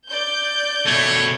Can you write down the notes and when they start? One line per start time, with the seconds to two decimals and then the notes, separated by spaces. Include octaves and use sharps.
0.10 D5 G6
0.86 B2 A3 C#5